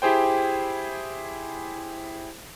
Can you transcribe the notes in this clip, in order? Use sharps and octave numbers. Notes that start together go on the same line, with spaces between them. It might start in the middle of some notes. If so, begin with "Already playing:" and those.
E4 G4 G#4 C5 G5